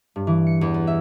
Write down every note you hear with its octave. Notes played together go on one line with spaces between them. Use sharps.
G2
E3
C#7
E2
B3
E5